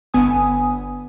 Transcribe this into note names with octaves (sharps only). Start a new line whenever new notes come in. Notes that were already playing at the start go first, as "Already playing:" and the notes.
G1 D3 B3 G#5 D#6